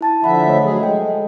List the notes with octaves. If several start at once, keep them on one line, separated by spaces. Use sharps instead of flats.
E4 A5 A6
D3 F3 E5 F#5 B5
A3 C#5 D#5
F#3 G#4
G#3 A4 G5